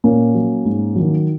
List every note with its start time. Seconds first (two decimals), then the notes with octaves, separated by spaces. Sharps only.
0.04 A#2 A#3 C#4
0.35 F#3
0.65 G#2
0.95 D#3 F#3